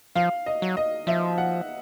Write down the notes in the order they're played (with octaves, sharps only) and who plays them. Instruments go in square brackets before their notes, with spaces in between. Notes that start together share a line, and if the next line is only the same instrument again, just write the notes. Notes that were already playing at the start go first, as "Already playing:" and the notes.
[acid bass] F3 [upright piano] F5
[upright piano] D#5
[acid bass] F#3
[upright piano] D#5
[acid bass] F3 [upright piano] E5
[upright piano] F#5